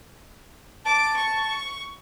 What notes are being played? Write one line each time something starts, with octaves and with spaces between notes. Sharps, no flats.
A5 D6
C#6